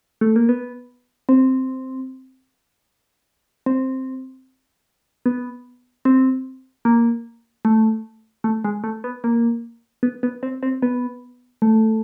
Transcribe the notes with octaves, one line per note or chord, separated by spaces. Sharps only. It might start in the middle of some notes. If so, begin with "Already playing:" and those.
A3
A#3
B3
C4
C4
B3
C4
A#3
A3
A3
G#3
A3
B3
A#3
B3
B3
C4
C4
B3
A3